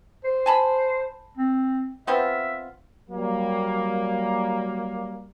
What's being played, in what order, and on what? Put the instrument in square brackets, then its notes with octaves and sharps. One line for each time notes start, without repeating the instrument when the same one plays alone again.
[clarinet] C5
[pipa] G#5 A5 B5
[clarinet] C4
[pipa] B3 C4 F4 [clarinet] E5
[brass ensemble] F#3 G3 A#3